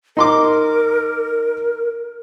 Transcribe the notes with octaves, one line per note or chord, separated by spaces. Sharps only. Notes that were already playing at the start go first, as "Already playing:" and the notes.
D#4 A#4 C6 D6